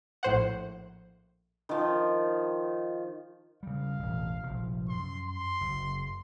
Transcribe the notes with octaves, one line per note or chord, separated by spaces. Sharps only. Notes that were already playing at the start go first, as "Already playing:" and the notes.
A#1 A2 C5 F#5
D#3 F3
C#3 G3 F5
E1 A1
F1 A#1 F3
F#2 C6
C6
F#1